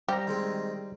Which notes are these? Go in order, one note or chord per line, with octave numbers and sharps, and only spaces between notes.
G3 G4 C5 A#5 A#6
D#3 G#3 C4